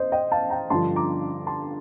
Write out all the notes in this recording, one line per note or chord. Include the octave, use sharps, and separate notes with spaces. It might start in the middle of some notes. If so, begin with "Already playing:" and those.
Already playing: C5 D#5
D#5 G5
F5 A5
G5 A#5
G2 D3 F3 A5 C6
A#5 D6
A5 C6